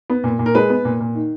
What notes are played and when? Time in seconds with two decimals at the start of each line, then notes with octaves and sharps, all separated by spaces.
0.10 B3
0.24 A#2
0.39 A#2
0.46 A#4
0.55 G#3 B4
0.70 B3
0.85 A#2
1.00 A#2
1.15 D#3